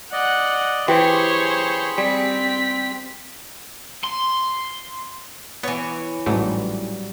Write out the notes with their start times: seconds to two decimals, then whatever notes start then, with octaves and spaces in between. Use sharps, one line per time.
0.13 D5 D#5 F#5
0.88 E3 G4 G#4 C5 C#5 B5 C#6
1.98 G3 C4 B6
4.04 C6
5.63 E3 B3 C#5
6.26 A1 G#2 F#3 G3 A3